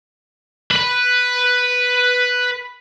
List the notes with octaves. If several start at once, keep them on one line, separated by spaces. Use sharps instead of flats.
B4 B5